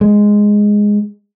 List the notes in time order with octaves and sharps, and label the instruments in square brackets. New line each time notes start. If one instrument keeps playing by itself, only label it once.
[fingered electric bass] G#3